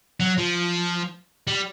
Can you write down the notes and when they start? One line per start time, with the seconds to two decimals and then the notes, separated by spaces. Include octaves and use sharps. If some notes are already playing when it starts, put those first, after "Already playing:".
0.20 F#3
0.38 F3
1.47 G3